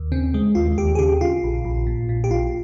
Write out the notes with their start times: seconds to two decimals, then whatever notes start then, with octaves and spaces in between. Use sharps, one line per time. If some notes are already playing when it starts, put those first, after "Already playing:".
Already playing: D#2
0.12 C#3 C4
0.34 C#3 G#3
0.55 D#2 F4
0.78 D#2 G4
0.95 G#4
0.99 C#3 G4
1.21 C#3 F4
1.44 A#1
1.65 A#1
1.87 A#2
2.09 A#2
2.24 G4
2.30 A#1 F4